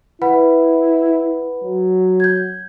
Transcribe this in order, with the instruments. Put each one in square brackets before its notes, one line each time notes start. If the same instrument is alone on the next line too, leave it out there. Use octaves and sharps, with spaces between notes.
[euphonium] E4 [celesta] B4 F#5 B5
[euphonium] F#3
[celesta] G6 G#6